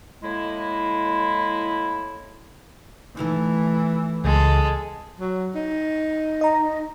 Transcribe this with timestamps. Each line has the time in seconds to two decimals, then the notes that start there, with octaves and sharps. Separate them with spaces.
0.23 A2 G#3 A#3 E4
3.17 E3 A3 D#4 E4
4.25 C#2 G#3 A4
5.20 F#3
5.55 D#4
6.41 D#5 A#5